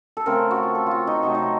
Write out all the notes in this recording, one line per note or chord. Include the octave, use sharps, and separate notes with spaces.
A4
C#3 A3 C4 A#4
A4
F#4
F4
A4
F4 F#4
D#4
C3 F#3 A3 D#4
D#4